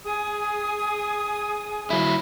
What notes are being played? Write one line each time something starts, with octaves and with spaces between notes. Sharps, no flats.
G#4 G#5 D#6
F#3 E4